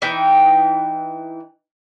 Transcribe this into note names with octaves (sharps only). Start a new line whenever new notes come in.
E3 D#4 E5 G5